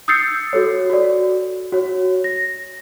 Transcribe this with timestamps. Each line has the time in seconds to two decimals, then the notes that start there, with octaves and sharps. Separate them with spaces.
0.08 D#6 E6 G6 A6 C7 C#7
0.53 F#4 A4 C#5
0.90 F#4 D5
1.72 F#4 C#5
2.24 A#6